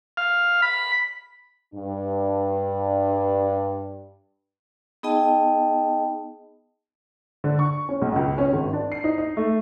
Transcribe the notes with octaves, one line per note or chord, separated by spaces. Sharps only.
F5
B5
G2 D4
B3 D#4 G#4 D#5 G5 A5
D3
C#6
C#4
B1
C#2
C#4
G#1
D4
C7
D#4
D#4
A3